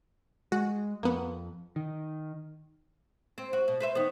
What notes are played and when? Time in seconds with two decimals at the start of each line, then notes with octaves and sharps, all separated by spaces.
0.52 G#3 F#4
1.03 F2 A#3 B3
1.76 D#3
3.38 C4
3.53 F#4
3.68 B2
3.80 B4 C5 E5
3.95 D#3 B3